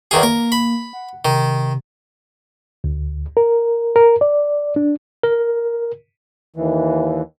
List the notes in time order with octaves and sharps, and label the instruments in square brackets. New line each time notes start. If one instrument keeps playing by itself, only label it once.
[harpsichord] E2 D#3 G#4 [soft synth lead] F6
[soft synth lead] A#3 [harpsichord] A#4
[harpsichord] B5
[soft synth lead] F#5
[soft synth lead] C3 [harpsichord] D#3
[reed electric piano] D2
A#4
A#4
D5
D4
[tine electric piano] A#4
[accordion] D#2 E3